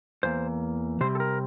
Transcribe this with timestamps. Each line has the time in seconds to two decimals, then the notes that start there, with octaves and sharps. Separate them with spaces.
0.23 E2 E3 A#3 C5
1.01 C3 G3 C4 C5
1.15 A4
1.20 A#4